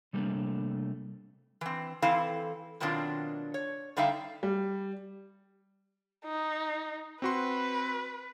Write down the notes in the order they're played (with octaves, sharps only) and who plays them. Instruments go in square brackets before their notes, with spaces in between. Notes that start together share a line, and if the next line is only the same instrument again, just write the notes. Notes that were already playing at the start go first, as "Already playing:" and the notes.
[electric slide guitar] C3 G3 A3 A#3 D4
[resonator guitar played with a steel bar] E3 C4
E3 C4 E4 A4 F5
B2 D#3 F#3 C4 D4 F4
C#5
D3 G3 D#4 E5 F5 G5
[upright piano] G3
[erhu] D#4
[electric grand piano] C4 F#4 C6 [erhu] B4